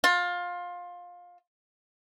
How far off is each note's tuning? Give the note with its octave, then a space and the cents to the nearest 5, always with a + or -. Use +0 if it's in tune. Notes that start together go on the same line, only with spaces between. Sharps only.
F4 +20